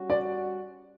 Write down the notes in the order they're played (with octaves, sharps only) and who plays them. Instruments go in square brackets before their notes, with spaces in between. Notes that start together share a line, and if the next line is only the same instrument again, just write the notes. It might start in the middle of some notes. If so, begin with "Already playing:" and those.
Already playing: [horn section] G3 C#4 F#4
[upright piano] D5